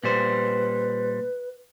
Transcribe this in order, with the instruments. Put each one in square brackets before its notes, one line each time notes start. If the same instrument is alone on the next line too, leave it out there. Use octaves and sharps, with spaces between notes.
[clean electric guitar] A#2 G3 C5 [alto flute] B4